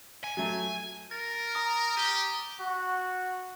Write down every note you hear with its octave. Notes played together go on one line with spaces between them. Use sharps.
G#5
F#3 A3
A#4 A6
A#5 D#6
G4 D#7 G7
F#4